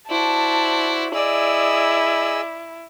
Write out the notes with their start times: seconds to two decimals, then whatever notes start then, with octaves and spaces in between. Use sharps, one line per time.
0.10 E4 F#4 C5 D5 A5
1.14 E4 G#4 D5 D#5 E6